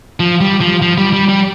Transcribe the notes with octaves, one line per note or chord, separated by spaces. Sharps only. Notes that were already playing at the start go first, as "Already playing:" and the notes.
F3
G3
F3
F3
G3
G3
G3